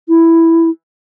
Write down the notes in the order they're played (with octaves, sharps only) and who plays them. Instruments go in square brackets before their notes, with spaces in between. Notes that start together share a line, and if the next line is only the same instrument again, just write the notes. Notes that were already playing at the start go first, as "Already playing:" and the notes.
[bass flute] E4